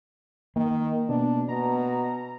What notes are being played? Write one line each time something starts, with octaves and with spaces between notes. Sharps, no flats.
D#3 A#3
B2 D4
B2 A#5